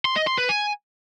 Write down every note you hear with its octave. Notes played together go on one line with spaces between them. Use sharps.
C6
D#5
C6
B4
G#5